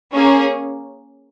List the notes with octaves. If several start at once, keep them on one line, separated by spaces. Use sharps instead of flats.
A#3 C#4 G#4